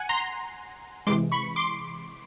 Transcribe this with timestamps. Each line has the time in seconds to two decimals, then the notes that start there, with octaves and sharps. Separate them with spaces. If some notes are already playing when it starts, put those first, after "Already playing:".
Already playing: F#5 G#5
0.09 A#5 C6
1.07 C3 E3 G#3 C6 D6
1.32 B5 C#6
1.56 C6 D6